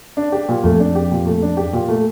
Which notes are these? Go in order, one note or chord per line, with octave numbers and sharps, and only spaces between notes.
D4
G4
A#2
F2 A3
D4
G4
A#2
A3
D4
G4
A#2
A3